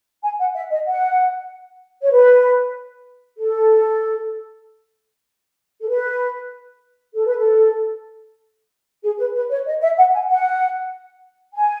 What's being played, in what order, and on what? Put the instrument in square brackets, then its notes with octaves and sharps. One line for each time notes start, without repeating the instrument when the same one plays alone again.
[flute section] G#5
F#5
E5
D#5
F#5
C#5
B4
A4
A4
B4
A4
B4
A4
G#4
B4
B4
C#5
D#5
E5
F#5
G#5
F#5
G#5